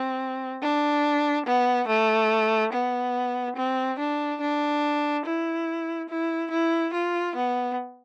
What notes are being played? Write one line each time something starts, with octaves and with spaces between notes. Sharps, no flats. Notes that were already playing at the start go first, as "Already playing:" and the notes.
Already playing: C4
D4
B3
A3
B3
C4
D4
D4
E4
E4
E4
F4
B3